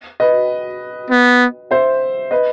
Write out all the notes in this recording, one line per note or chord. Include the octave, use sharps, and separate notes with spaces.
B4 D#5
B3
C5 E5
B4 D#5